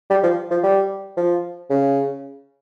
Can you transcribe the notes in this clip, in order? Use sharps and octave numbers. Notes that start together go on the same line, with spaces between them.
G3
F3
F3
G3
F3
C#3